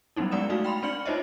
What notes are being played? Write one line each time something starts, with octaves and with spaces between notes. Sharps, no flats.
F#3 G3 B3 C#4 D#4 E4
G#3 B3 D5 F#5 D#6 E7
A3 D#4 E4 F#4 D5 F5
G5 B5 C6 F7
C4 D4 D5 F6 C#7 F#7
D#4 F4 C5 C#5 D#5 E5